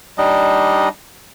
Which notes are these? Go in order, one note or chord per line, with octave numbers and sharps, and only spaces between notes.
G3 D4 D#4 D#5